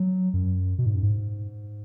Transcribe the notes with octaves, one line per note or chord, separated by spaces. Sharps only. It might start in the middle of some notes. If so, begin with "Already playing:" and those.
Already playing: F#3
F#2
B2
G#2
F#2
G#2